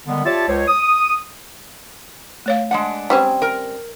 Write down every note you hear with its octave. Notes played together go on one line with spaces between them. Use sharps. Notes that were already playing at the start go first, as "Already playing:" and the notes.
D3 D#3 G3 G#3 B3
F4 G4 C#5 D5 E5 A5
C#2 C5 C#5
D#6
A3 C#5 F5
G#3 D4 F#5
G3 C4 C#4
A#4